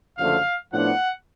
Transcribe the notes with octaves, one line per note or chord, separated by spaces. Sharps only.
F#1 F#2 D3 F3 A3 F5
A2 F3 B3 D4 F#5